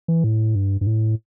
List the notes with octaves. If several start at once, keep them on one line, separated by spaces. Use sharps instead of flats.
E3
A2
G2
G2
A2